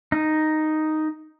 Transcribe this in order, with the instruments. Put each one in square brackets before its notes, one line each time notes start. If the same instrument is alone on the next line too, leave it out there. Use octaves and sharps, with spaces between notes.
[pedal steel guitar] D#4